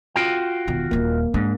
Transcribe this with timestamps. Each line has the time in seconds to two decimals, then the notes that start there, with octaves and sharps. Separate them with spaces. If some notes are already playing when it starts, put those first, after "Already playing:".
0.16 F4 F#4 G5
0.68 E1 D#3
0.91 D#1 D#2 A#3
1.34 G#2 D4